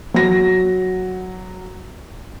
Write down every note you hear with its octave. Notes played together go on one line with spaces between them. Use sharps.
F#3 A#6